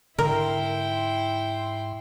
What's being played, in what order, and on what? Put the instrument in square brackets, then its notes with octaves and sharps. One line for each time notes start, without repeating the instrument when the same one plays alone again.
[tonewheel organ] G#2 C6 [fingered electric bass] D3 [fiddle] E4 G5 [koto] A#4